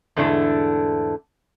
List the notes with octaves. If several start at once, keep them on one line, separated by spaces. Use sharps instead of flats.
E2 G#2 D3 A3 D4 E4